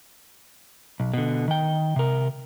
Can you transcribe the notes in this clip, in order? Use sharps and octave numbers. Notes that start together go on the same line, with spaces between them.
B1
B2 D3
D#3 G5
C3 A#4